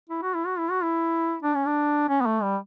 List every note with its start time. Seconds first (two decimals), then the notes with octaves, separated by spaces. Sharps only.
0.09 E4
0.22 F#4
0.34 E4
0.46 F#4
0.58 E4
0.70 F#4
0.83 E4
1.42 D4
1.54 C#4
1.66 D4
2.09 C#4
2.21 B3
2.26 A3
2.42 G3